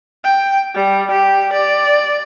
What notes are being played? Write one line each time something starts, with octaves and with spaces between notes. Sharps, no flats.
G5
G3
G4
D5